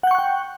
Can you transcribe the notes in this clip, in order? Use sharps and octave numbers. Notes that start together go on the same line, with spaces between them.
F#5 G5 C#6 F#6 G6